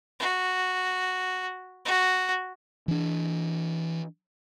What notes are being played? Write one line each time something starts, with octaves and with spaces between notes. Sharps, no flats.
F#4
F#4
E3 D4